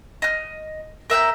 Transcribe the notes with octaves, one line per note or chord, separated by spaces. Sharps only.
D#5 F6
A#4 E5 F#5 G5